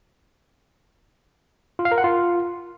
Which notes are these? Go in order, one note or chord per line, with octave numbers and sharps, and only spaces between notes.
F4
F5
A#4
F#5
F4